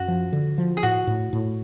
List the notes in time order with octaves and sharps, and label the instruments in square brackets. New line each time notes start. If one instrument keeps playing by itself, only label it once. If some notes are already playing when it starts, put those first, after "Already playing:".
Already playing: [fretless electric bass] F#2 [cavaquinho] F#4
[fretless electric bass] F3
D3
F3
[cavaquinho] G#4
[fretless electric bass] A2 [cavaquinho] F#4
[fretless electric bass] A2
A2